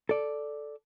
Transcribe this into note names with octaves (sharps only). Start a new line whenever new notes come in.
A4 D5